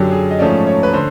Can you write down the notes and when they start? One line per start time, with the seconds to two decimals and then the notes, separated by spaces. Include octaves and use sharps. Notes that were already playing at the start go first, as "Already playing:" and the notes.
Already playing: F#2 D3 F#3 G4
0.12 G#4
0.31 D#5
0.39 G#2 F3 A3 C#4 D5
0.67 C#5
0.83 B4
0.93 D3 C5